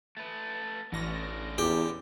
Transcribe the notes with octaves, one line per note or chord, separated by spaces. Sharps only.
A3 B4
A1 D3 C#4 A#6
E2 G4